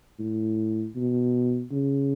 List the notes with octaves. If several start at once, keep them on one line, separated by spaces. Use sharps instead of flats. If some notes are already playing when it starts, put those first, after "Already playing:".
A2
B2
C#3